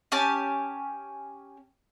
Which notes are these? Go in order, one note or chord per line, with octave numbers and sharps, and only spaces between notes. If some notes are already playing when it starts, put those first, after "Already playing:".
C#4 G4 G#5 A5